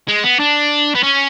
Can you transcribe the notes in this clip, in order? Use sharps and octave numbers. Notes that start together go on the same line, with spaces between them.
G#3
B3
D4
B3
C#4